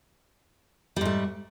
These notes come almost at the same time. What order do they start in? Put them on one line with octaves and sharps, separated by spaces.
G3 G#2 A3